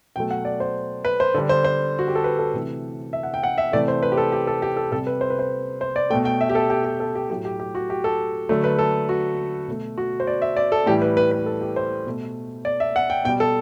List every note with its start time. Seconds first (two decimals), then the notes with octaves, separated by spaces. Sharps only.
0.16 B2 F#3 A3 G5
0.31 F#5
0.45 D5
0.60 C5
1.05 B4
1.20 C5
1.34 D3 G3
1.49 C5
1.64 C5
1.99 F#4
2.08 G4
2.15 A4
2.24 B4
2.39 A4
2.53 C3 E3 A3
3.13 E5
3.23 F#5
3.34 G5
3.43 F#5
3.58 E5
3.72 C3 E3 A3 D5
3.88 C5
4.03 B4
4.12 G4
4.17 A4
4.32 G4
4.47 A4
4.62 G4
4.77 A4
4.92 C3 G3 A4
5.07 B4
5.21 C5
5.30 B4
5.39 C5
5.81 C5
5.96 D5
6.10 A3 G5
6.14 B2
6.25 G5
6.41 E5
6.49 G4
6.55 A4
6.70 G4
6.85 G4
7.00 A4
7.15 G4
7.30 A2 F#3 A3 G4
7.45 G4
7.60 G4
7.75 F#4
7.90 G4
8.04 A4
8.49 D3 F#3 A3
8.64 B4
8.79 A4
9.09 F#4
9.67 B2 A3
9.98 F#4
10.20 C5
10.27 D5
10.42 E5
10.57 D5
10.72 A4
10.86 A2 E3 G3 G4
11.02 B4
11.17 B4
11.31 B4
11.46 A4
11.61 G4
11.76 C5
12.05 B2 A3
12.65 D5
12.80 E5
12.96 F#5
13.10 G5
13.25 B2 G5
13.29 G3
13.40 A4